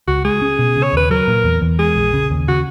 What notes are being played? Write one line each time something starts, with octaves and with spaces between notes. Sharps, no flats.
C#2 F#4
G#3 G#4
C#4
B2
C#3
C#5
D#2 B4
F#3 A#4
A#2
E2
E2
G#3 G#4
A#1
C#3
D#2
C#3 F#4